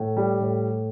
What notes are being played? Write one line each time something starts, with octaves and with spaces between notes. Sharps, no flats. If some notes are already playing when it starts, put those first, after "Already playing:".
Already playing: A2
G3
A2